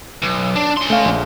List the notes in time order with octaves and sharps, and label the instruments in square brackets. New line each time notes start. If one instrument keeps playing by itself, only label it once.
[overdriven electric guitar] B1
D4
C#4 C6
[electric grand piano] A3 F5
A#1